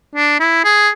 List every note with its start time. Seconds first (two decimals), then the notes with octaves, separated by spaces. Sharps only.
0.15 D4
0.40 E4
0.64 G#4